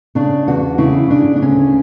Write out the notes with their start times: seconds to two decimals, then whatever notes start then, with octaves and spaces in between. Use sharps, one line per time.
0.15 C#3 D4
0.48 E2 F#4
0.78 C#3 E4
1.10 C#3 D4
1.36 D4
1.41 D2 C#4